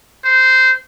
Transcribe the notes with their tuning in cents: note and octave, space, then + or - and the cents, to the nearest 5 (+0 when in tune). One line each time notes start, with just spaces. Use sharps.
C5 -15